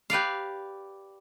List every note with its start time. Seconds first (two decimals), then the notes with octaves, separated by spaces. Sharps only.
0.10 G4 B4 D5 F5